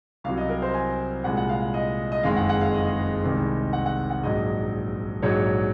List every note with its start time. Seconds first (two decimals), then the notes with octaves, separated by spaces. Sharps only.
0.24 C2 C3 F#3 F5
0.37 D#5
0.49 A#4
0.62 C5
0.74 G#5
1.24 C2 A#2 G#3 F#5
1.37 F#5
1.49 F5
1.61 F5
1.74 D#5
2.12 D#5
2.23 F#1 F2 D#3 G#3 F5
2.36 F#5
2.49 F#5
2.61 F5
2.74 D#5
3.24 C2 C3 D#3 G#3
3.73 F#5
3.86 F#5
4.10 F#5
4.23 A#1 G#2 F#3 D#5
5.22 A#1 G#2 F#3 C#5